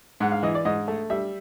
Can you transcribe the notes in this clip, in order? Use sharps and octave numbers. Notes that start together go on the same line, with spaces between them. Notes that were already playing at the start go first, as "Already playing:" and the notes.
G#2 F#5
F5
E3 D#5
D5
G#2 D#5
A3
G3 E5